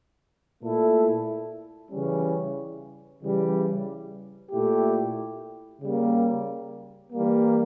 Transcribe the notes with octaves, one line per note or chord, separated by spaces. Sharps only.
A#2 A3 E4 A4
C#3 E3 G3 C#4
C#3 E3 G3
A#2 A3 E4 G4
C#3 G3 A#3
E3 G3 A#3